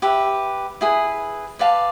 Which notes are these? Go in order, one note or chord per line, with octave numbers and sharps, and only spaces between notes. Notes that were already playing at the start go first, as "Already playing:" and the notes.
G4 B4 E5
E4 G#4 B4
B4 D5 F5 A5